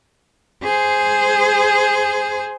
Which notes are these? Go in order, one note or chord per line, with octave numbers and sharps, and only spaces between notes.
G#4 C5